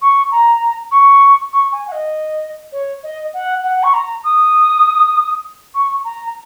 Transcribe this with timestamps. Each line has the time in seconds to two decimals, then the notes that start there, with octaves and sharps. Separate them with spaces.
0.02 C#6
0.31 A#5
0.91 C#6
1.53 C#6
1.72 G#5
1.88 F#5
1.92 D#5
2.72 C#5
3.03 D#5
3.34 F#5
3.63 F#5
3.83 C#6
3.93 A#5
4.24 D#6
5.75 C#6
6.04 A#5